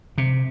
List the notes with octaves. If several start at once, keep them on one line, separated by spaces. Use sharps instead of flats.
C3